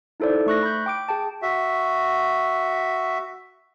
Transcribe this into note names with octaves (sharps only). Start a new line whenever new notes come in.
D#4 E4 A4 C5 D5
A3 C#6 F#6 A#6
B5 G6
G5 D6 D7
G#4 G5 A5
F#4 E5